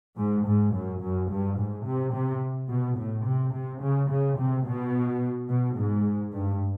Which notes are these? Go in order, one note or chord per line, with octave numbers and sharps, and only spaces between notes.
G#2
G#2
F#2
F#2
G2
G#2
C3
C3
B2
A2
C3
C3
C#3
C#3
C3
B2
B2
G#2
G2